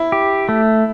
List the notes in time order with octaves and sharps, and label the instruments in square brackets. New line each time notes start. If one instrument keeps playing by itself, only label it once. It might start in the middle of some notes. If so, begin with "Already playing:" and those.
Already playing: [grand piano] E4
[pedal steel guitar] G4
A3